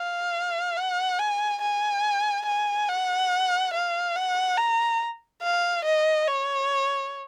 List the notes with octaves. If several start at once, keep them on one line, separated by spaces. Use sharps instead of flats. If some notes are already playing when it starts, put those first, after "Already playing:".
Already playing: F5
F#5
G#5
G#5
G#5
F#5
F5
F#5
A#5
F5
D#5
C#5